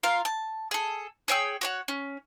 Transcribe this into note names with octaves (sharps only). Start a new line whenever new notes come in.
F4 A#4 F5
A5
G#4 A4
G#4 C#5 G5 E6
F#4 C#5 F#5
C#4